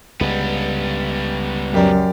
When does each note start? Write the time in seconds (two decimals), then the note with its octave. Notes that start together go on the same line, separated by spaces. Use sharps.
0.21 C#2 G3 B3
1.74 F#2 G4 A#4 D5